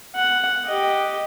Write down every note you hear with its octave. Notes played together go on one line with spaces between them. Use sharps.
F#5
G4 D#5